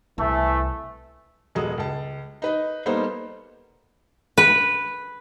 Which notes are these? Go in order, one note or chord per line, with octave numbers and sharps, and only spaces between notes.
C2 E3 A3
D#1 F#3 G#3 A4 D#6
C#2 A5
D#4 B4 D#5
G3 A#3 B3 D#4 A4 C5
B4